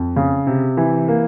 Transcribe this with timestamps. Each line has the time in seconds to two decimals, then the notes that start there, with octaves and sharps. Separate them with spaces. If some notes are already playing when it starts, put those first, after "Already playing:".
Already playing: F2
0.16 C#3
0.47 C3
0.77 E3
1.08 A#3